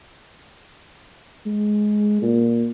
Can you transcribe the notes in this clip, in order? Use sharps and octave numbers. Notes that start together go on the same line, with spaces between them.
G#3
A#2